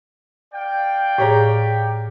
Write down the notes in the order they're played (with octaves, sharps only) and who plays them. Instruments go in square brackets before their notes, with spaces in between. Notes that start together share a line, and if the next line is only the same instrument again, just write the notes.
[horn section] D5 F5 G5
[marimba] A2 G#4 [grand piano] G4 C#5 A#5